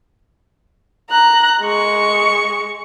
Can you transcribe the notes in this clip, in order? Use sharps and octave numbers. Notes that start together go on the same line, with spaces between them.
A#5 F#6
G#3 C#6